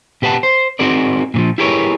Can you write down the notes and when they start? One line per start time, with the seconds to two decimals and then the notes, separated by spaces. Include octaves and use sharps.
0.22 B2 G4 B4 F#5 A5
0.43 C5
0.79 C4 D#4 F#4 G#4 A#4 D5
1.34 A#2 E3 F3
1.58 E4 G4 G#4 A#4 B4 C#5